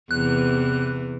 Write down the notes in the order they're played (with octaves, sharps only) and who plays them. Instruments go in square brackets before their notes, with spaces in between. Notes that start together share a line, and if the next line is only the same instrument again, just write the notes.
[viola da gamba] E2 C3 E3 [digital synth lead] F#6